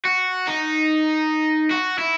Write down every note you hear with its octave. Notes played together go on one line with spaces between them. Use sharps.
F#4
D#4
F#4
E4